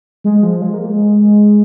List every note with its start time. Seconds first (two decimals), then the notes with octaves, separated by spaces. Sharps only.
0.24 G#3
0.43 F3
0.62 G#3
0.74 A#3
0.86 G#3